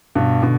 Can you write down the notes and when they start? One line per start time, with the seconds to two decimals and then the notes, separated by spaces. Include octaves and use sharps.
0.15 G2 B2
0.42 B2 D3